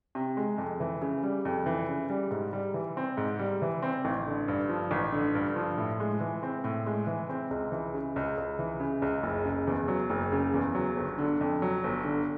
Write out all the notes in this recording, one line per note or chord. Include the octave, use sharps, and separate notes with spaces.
C3
G#3
F2
E3
C#3
G3
F2
E3
C#3
G3
G#2
G3
E3
C4
G#2
G3
E3
C4
A1
D3
G2
F3
A1
D3
G2
F3
A2
G#3
E3
C4
A2
G#3
E3
C4
C#2
E3
C#3
C#2
C#2
E3
C#3
C#2
F#1
C#3
E2
F#3
F#1
C#3
E2
F#3
G1
D3
F2
F#3
G1
D3